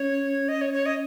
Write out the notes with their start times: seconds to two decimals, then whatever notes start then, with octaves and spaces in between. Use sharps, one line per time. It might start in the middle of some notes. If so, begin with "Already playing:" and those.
Already playing: C#4 C#5
0.48 D#5
0.61 C#5
0.74 C#5
0.86 D#5